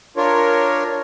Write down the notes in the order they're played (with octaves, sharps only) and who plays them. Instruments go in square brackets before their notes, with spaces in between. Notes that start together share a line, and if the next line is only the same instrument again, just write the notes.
[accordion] D4 F4 A#4 C#5